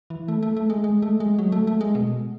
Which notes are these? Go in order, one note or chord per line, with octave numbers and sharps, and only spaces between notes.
E3
A3
A3
A3
G#3
G#3
A3
G#3
F#3
A3
A3
G#3
B2